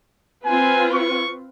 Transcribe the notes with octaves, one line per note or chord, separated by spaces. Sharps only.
C4 F4 B4 G#5
C#6